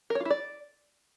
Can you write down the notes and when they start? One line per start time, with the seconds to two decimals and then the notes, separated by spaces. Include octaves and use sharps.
0.10 A#4
0.15 C#5
0.20 F4
0.25 E4
0.30 D5